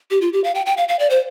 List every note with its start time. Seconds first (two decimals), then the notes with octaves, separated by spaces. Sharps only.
0.11 G4
0.21 F4
0.33 G4
0.44 F5
0.55 G5
0.66 G5
0.77 F5
0.88 F5
0.99 D5
1.10 C5